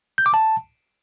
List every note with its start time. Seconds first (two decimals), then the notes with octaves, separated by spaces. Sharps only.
0.18 G6
0.26 D6
0.34 A5